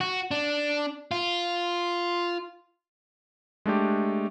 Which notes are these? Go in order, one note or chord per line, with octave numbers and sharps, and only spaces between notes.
F#4
D4
F4
G#3 A3 D4 G4